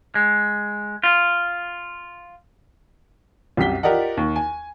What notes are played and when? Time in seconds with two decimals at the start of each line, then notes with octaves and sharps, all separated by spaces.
0.15 G#3
1.04 F4
3.57 C2 F#2 G4 B6 G7
3.83 F4 G4 A#4 D5 D#5 F#5
4.17 D#2
4.36 G#5